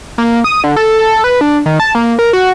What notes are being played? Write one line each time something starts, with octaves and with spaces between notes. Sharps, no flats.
A#3
D#6
D3
A4
B4
D4
D#3
A5
A#3
A#4
F#4